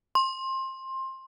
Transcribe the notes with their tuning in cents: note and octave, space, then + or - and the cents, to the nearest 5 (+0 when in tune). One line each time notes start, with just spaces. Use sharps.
C6 +20